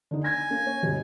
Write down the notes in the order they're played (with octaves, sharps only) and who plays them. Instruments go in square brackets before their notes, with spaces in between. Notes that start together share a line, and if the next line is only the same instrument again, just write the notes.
[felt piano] D3 D#4
[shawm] G#5 [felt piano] G#6 A#6
[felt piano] A#3 C#4
C#5
G1 B2 G4